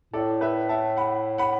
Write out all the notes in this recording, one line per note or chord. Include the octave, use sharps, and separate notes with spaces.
A2 A4 D5
B4 E5
E5 A5
F#5 B5
F#5 B5